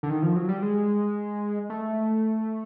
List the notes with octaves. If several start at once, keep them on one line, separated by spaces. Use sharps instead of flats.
D3
D#3
F3
F#3
G3
G#3
A3